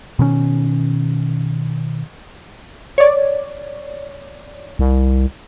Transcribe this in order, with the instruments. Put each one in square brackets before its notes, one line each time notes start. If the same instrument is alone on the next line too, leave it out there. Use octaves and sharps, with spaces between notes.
[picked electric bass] B2 D#3 C#4
[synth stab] C#5 D5
[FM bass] C2